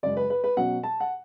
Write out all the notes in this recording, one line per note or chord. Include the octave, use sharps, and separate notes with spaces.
F#2 C#3 G#3 D5
B4
B4
B4
B2 F#3 C#4 F#5
A5
F#5